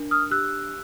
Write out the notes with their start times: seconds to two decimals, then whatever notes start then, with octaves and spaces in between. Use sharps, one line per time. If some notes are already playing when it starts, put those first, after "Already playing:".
Already playing: D4 A#4
0.11 D#6 F6
0.31 G4 E6 F#6